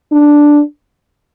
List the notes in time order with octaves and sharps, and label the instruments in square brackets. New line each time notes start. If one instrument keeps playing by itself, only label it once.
[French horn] D4